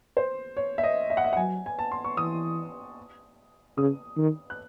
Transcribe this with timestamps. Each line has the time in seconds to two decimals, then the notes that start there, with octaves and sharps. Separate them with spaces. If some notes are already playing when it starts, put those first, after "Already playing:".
0.17 C5
0.57 C#5
0.78 E5
0.84 D#5
1.10 E5
1.17 F#5
1.24 E5
1.33 F#5
1.37 F#3 G#5
1.66 G#5
1.79 A5
1.92 C6
2.04 C#6
2.17 E3 D#6
3.77 C#3 D#6
4.17 D#3
4.50 F#6